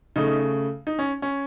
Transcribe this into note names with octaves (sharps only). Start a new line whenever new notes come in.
C#3 A3 D#4
D#4
C#4
C#4